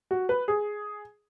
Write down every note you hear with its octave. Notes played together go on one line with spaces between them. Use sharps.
F#4
B4
G#4